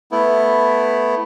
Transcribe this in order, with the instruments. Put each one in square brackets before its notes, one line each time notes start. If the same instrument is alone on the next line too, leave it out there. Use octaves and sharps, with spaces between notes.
[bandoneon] A3 B3 E4